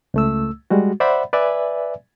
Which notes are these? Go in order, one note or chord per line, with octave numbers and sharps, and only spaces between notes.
C#2 A3 E6
G3 G#3 F#4
C5 D5 E5 F#5 B5
B4 D5 E5 G#5